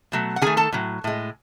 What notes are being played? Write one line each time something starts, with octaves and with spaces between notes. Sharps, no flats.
B2 F#3 A3
F#5
D#3 A3 G#4 G#5
A4 A5
A2 F#3
A2 G#3